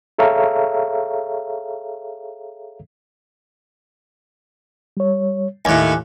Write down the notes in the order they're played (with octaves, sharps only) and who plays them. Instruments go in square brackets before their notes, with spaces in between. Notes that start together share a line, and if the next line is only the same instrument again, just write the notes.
[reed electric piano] G#4 A4 C#5 E5 F5 A#5
G3 C#5
[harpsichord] D#2 A2 [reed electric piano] G#5 D6 F#6